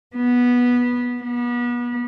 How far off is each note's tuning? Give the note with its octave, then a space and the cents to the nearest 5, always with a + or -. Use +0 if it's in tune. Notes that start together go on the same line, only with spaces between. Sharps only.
B3 -15
B3 -35